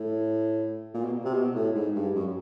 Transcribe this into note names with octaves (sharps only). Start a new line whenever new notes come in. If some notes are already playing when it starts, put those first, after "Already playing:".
Already playing: A2
A#2
B2
C3
B2
A2
G#2
G2
F#2